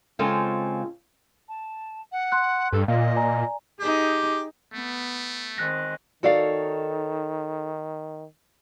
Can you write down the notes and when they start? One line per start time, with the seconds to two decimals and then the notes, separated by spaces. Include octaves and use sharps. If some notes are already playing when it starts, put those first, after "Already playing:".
0.19 C#3 G#3 C4 F4 A4 C5
1.49 A5
2.12 F#5
2.32 C6 F#6
2.72 G2 A4
2.88 A#2 D#5 F5
3.16 D5 G#5 A#5
3.80 D#4 G4 G#4
4.74 A3 B3
5.58 D#3 G#3 C4 F#6 A#6
6.23 D#3 D#4 F#4 A4 C#5 D5 F5